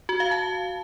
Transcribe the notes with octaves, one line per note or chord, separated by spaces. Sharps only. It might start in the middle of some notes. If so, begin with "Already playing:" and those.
F#4
F5
A5